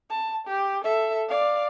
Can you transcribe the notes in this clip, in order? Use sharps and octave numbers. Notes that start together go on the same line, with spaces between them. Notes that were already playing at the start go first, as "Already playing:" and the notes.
A5
G4
A4 E5
D5 F5